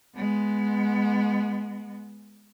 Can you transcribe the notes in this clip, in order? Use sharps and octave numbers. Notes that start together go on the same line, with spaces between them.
G#3 B3